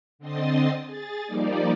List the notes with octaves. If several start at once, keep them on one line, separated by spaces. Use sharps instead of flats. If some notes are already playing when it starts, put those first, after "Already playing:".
D3 C4 D#5 C6 D#6 A6
G#4 A6
F3 G3 A#3 D#4 D5